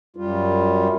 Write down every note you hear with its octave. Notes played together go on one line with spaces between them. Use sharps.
F#2 G3 F4